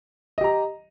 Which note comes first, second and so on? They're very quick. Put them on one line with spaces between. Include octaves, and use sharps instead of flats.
D#5 G4 A#5